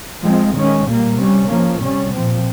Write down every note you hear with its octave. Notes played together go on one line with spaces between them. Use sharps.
F3 G#3 C4
D#3 G#3 C#4
A#2 G3 A#3
C3 G3 C#4
F3 A#3 C#4
C3 G3 C#4
A#2 F3 C4